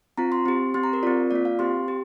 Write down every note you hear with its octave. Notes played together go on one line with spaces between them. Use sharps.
C4 F4 A#5
C6
C4 G4
C4 G4 C6
A#5
A#4
C4 F4 D5
A#3 F4 D5
F5
C4 G4 C6
G4